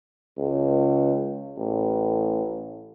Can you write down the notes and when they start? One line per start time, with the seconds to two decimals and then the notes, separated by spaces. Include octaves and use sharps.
0.38 C#2
1.57 A1